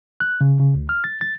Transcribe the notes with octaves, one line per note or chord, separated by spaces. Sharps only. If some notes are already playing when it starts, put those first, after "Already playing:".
F#6
C#3
C#3
D2
F6
A6
A6